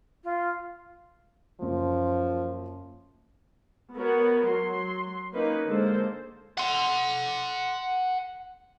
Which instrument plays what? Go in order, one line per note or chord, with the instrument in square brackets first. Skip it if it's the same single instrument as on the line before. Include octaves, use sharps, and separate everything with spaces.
[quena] F4
[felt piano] F#1 F#2 [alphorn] F3
[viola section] B3 F#4 A#4 C#5
F#3 C6
A#3 C#4 D#4 B4
D3 G#3 A#3 A4 C5
[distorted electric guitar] F#5 C6